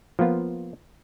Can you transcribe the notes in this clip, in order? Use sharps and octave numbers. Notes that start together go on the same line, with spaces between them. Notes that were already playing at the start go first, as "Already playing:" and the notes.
F3 A#3 B3 F4